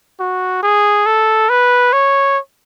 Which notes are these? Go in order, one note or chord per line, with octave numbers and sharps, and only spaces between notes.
F#4
G#4
A4
B4
C#5